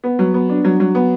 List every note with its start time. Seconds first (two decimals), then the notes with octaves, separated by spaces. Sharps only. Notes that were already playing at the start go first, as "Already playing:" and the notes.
0.04 B3
0.19 F#3
0.34 B3
0.49 D4
0.65 F#3
0.80 F#3
0.95 B3